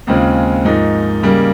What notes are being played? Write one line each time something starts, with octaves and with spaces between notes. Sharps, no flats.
D#2 C#3 G#3 C4 F4
G#2 F3 A#3 D#4
C#3 G3 A#3